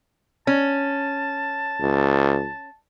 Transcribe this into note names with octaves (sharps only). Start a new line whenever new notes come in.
C#4 A5
C#2